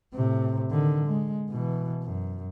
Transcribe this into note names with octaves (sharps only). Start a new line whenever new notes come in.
A2 C3
D3 D#3
G#3
B2 E3
F#2